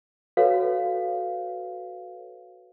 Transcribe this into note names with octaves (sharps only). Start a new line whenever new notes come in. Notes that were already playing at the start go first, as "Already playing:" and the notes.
F#4 A4 B4 C#5 F5